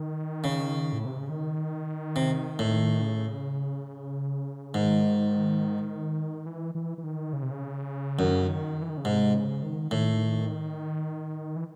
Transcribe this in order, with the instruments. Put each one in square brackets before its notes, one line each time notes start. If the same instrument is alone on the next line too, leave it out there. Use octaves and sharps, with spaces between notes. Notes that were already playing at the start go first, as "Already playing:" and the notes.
Already playing: [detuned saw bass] D#3
[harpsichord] C#3
[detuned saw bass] A2
C3
C#3
D#3
[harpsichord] C3
A2
[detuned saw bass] C#3
[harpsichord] G#2 [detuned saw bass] D#3
[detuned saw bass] E3
E3
E3
D#3
C#3
C3
C#3
[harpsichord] F#2 [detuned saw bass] D#3
[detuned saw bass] C#3
D#3
E3
D#3
C#3
[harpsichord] G#2 [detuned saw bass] C3
[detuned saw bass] C#3
D#3
[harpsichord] A2 [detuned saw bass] D#3
[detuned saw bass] E3